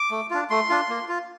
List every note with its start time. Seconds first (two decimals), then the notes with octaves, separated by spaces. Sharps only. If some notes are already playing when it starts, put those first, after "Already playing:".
Already playing: D6
0.11 A3
0.31 D4 F4
0.50 A3 C6
0.69 D4 F4
0.89 A#3
1.08 F4